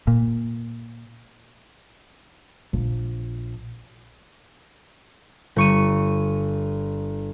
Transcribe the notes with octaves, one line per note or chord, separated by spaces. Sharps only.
A#2
A#1
G1 C#6 D#7